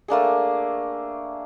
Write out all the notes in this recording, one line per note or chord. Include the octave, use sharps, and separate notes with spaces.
A3 A#3 D4 G#4